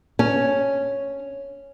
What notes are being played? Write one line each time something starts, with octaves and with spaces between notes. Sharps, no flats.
C#4